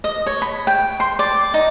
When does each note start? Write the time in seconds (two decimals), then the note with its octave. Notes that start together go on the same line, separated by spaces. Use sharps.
0.04 D#5
0.26 C#5
0.42 B5
0.67 G5
1.00 C6
1.19 D5
1.54 D#4